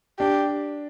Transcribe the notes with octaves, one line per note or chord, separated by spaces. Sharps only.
D4 G4